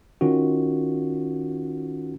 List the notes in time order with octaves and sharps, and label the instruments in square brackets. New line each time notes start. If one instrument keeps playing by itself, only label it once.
[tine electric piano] D#3 C#4 F4 F#4